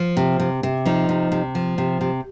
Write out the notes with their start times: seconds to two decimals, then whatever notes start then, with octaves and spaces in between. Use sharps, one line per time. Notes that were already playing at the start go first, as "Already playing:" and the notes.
Already playing: F3
0.17 C3
0.40 C3
0.63 C3
0.86 F3 D#4
1.09 C3
1.32 C3
1.55 F3
1.78 C3
2.01 C3